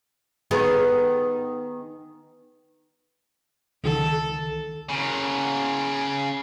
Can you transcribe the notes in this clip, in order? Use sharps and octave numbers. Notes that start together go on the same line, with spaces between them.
D#3 B3 G#4
C#2 D#3 A4
C#3 A#4